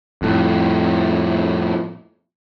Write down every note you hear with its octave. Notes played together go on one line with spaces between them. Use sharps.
F2 A2